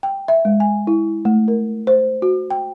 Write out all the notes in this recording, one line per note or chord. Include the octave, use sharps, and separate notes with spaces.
G5
E5
G#3
G#5
E4
A3
A#4
C5
F#4
G5